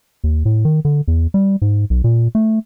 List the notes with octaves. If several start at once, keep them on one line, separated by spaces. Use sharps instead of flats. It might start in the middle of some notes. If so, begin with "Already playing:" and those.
D#2
A2
D#3
D3
E2
G3
G#2
B1
A#2
A3